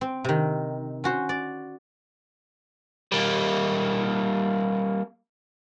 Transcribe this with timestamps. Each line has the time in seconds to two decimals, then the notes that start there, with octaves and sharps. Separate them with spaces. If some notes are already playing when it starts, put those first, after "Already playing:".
0.01 C4
0.24 C3 D#3
1.04 C#4 F#4 C5
1.29 D5
3.12 G3 A#3